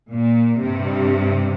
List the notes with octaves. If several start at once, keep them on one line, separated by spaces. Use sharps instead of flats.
A#2
G2 C3